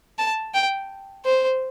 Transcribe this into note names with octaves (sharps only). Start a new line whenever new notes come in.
A5
G5
C5